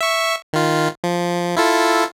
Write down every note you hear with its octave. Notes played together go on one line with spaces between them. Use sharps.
E5 C#6
D#3 F4
F3
E4 F4 A4